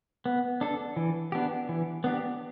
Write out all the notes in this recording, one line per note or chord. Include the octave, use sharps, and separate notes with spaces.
B3
D4 A4
E3
B3 D4 G4
E3
B3 D4 G4